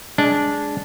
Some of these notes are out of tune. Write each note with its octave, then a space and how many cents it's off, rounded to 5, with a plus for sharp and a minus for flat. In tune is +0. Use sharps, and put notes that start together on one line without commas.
G#3 +0 D4 -10